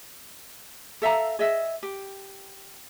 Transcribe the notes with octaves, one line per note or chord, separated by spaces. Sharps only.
A4 E5 F5 A#5
G#4 D#5 E5
G4